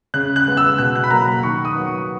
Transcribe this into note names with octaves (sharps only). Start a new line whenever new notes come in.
C#3 F#6
F#6
G#3 B3
E6
B2 F#6
F#6
B5
F#3 A#3 A#5
B5
D#3 C#6
D#6
F#3 B3
C#6